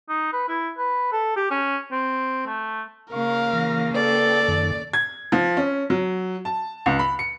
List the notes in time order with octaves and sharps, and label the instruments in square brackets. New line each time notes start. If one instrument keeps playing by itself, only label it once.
[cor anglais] D#4
B4
E4
B4
A4
G4
C#4
C4
A3
[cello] C#3 A#3 [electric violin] A#4 F5 [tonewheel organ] C#6
[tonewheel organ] E3 A#6
[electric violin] A4 [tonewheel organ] B4 G5 [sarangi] D5
[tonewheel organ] F#2 D#3
[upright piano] G#6
F3
C#4
F#3
A5
C#2
B5
C#7